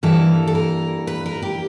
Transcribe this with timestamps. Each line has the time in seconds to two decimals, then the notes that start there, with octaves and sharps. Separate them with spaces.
0.03 G2 E3 G3 A#3 A4
0.47 A4
0.55 A#4
1.07 B4
1.26 A#4
1.43 G4